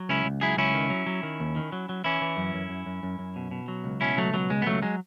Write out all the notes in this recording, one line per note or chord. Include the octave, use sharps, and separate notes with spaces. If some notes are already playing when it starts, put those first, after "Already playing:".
Already playing: F#3
C#2 C#4 E4
C#2
F#3 E4 G#4
C#2 C#4 E4
D#3
F#3
F#3
D#3
D#2
D#3
F#3
F#3
E3 C#4 E4
E3
F#2
F#2
F#2
F#2
F#2
F#2
B2
B2
F#3
C#2
B2 C#4 E4
C#2 F#3 A3
B2 F#3
C#2 G#3
B3
C#2 F#3 A3
F#3 G#3